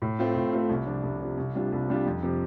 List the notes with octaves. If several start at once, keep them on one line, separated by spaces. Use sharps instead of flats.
A2
A3 C4 F4
A2
A3 C4 F4
C2
C3 F3 D4
C2
C3 F3 D4
C2
C3 G3 D4 F4
C2
C3 G3 D4 F4
F2
C3 F3